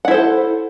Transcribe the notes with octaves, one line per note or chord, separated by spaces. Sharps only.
E4 A4 C5 F#5